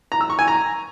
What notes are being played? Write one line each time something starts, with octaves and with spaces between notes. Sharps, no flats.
A#5
E6
C#6
G#5
A#5